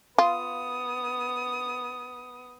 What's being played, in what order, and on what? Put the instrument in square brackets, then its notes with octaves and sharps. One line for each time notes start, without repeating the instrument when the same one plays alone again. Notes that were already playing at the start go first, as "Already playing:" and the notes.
[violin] B3 D#6 [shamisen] F4